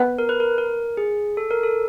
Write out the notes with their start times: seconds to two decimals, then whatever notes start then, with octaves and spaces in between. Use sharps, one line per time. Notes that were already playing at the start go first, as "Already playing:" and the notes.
Already playing: B3
0.19 A#4
0.29 B4
0.40 A#4
0.58 A#4
0.97 G#4
1.37 A4
1.51 A#4
1.63 A4